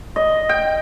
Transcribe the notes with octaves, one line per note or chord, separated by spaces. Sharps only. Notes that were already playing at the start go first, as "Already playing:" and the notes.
D#5
G5